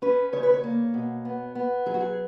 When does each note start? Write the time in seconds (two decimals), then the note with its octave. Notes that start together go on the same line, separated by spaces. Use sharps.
0.02 C#4 B4
0.33 C#3 C#5
0.43 B4
0.54 C#5
0.64 A#3
0.94 B2
1.25 B3
1.55 B3
1.86 F#3 G#4
1.94 F#4
2.00 G#4